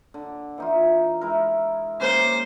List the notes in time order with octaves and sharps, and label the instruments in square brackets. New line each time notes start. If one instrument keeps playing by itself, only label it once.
[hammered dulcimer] D3
E3 D#4 F4
G#3 E4 A#4
[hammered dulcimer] G#3 A#3 C#4 [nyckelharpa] C5